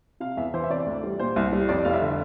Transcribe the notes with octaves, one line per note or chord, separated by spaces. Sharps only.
C3 F5
E2 E5
E3 C5
E5
C3 D5
D2
G3
A#2 C5
C2
G3
F2 D5
F1 F5
E5
D3